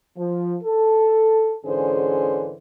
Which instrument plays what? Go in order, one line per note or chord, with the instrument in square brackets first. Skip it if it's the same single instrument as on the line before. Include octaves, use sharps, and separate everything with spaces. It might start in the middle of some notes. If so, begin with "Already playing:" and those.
[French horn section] F3
A4
G#2 D3 E3 C#4 G#4 C5